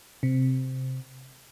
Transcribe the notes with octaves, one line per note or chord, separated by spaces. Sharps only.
C3